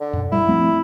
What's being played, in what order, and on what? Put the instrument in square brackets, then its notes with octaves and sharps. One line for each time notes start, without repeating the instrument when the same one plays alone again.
[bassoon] D3
[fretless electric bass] F#2 B2
[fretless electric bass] G2 G3 [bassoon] E4
[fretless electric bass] F3 A3 C4